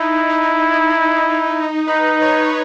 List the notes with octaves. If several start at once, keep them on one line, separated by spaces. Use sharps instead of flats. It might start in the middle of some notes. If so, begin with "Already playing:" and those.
Already playing: D#4 E4
D#4
D#4 B4
C#5